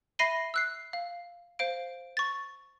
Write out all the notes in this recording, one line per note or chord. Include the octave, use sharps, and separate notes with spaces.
E5 B5 A#6 C7 D#7 G7
E6 F#6 C7
F5
C5 F5 D7
C#6 A6